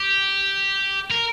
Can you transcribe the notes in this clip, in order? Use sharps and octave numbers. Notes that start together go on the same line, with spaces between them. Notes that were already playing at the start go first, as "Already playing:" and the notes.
Already playing: G4
A#4